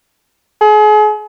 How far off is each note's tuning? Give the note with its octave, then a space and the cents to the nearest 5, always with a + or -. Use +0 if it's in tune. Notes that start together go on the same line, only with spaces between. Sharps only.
G#4 +35